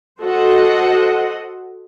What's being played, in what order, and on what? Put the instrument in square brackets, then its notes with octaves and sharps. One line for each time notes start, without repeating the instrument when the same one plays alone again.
[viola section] F#4 A4 C5 D#5 F#5